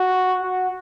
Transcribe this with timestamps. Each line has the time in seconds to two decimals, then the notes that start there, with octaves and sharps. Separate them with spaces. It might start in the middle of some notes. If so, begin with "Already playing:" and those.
Already playing: F#4
0.42 F#4